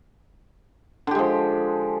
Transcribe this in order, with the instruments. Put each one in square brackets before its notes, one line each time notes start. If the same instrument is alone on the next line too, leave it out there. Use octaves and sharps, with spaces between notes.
[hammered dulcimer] D3
G4
G#3
F3